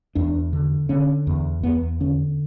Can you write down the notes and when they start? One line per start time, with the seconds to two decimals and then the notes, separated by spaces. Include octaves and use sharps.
0.15 E2 D4
0.53 D3
0.89 D3 C#4
1.27 E2
1.63 E2 B3
2.00 D3 C#4